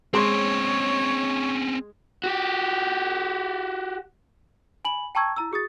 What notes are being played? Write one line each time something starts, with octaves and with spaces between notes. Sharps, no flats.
G#3 C4 C#4 C#5 C6
F#4 G4
G#5 B5 F#7
G5 A5 A#5 C#6 E6 G#6
E4 A#5 E6
F#4 G#4 D#6 A6